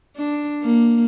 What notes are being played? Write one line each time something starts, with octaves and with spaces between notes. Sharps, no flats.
D4
A#3